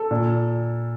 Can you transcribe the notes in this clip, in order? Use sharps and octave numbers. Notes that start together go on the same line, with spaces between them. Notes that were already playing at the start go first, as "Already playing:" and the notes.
Already playing: A4
A#2